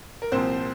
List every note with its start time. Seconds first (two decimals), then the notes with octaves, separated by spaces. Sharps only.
0.22 A#4
0.32 C2 A#2 F3 C4 C5